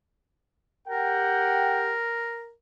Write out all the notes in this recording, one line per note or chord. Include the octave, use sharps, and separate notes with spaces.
G4 A#4 F#5 G5